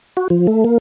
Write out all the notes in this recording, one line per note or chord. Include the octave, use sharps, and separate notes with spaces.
F#4
F3
A3
A#3